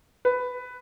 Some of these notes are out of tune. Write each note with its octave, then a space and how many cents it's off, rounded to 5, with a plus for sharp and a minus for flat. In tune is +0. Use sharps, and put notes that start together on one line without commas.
B4 +10